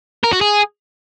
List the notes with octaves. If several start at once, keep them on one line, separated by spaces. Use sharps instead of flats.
A#4
F#4
G#4